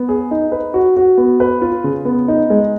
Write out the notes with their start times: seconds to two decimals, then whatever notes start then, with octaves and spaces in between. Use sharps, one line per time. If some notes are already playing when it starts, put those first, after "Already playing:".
Already playing: B3
0.09 G#4
0.31 D#4
0.52 B4
0.74 F#4
0.97 F#4
1.18 B3
1.40 B4
1.61 F4
1.84 C#3
2.05 B3
2.28 D#4
2.50 G#3